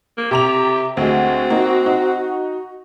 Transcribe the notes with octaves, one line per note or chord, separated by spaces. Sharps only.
A#3
C3 G4 A#5 F7
D2 G#3 C4 F#4
A#3 D#4
D#4